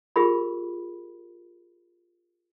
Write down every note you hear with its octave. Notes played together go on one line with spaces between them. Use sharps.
F4 G4 G#4 A#4 B5